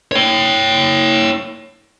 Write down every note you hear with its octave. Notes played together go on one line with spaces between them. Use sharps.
C#5 G5